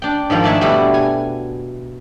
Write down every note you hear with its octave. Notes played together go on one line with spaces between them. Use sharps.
D4 G5
G#2 D#3 F3 A#4
A3 D4 D5 E5 G#5 A5
B2 G3 A3 D4 E4 F#4
G#5